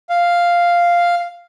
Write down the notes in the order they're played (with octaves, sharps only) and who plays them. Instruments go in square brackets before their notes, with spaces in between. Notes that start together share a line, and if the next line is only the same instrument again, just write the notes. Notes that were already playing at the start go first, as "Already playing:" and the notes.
[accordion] F5